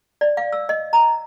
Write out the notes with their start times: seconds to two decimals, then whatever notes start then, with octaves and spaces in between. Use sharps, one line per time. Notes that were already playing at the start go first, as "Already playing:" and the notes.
0.21 D5
0.37 F5
0.53 E6
0.69 D#5
0.93 A#5